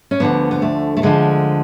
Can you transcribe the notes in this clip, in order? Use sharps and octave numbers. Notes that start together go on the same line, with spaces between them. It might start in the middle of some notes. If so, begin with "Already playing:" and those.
C#4
D2 D3 F3 B3
B3
A3
A3
D2 D3 F3 G#3